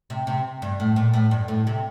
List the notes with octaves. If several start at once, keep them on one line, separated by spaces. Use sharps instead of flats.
C3
C3
G2
A2
A#2
A2
G2
A2
C3